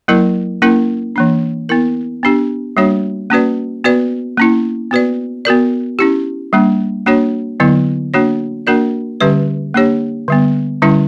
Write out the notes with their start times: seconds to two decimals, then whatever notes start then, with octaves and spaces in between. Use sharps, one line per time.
0.08 F#3 A#3 E4 A#4
0.62 A#3 C#4 E4 A#4
1.16 E3 A#3 D4
1.69 B3 E4 A#4
2.23 B3 D4 G4
2.77 G3 A#3 D4 F#4 C#5
3.30 A#3 C#4 F#4 B4 D5
3.84 B3 F#4 B4 D5
4.37 A#3 C#4 E4
4.91 B3 F#4 B4 D5
5.45 B3 F#4 A#4 D5
5.99 C#4 E4 G4
6.53 G3 A#3 D4
7.06 A#3 D4 F#4 C#5
7.60 D3 F#3 B3 E4
8.14 A#3 D4 F#4 C#5
8.67 A#3 D4 F#4 A#4 D5
9.21 D3 G3 C#4 G4 B4
9.74 A#3 D4 G4 C#5
10.28 D3 G3 B3
10.82 D3 G3 C#4 E4